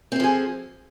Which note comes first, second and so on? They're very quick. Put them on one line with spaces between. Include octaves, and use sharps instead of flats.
C4 A4 F3 G#4